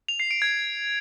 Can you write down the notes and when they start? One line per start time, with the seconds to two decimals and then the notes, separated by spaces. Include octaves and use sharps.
0.08 F7
0.20 C7
0.31 D7
0.42 G#6